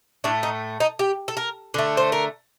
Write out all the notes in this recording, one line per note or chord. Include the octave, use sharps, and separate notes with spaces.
A2 A3 D4
D#4
D#4
G4
A4
A#4
D3 A3
C5
A#4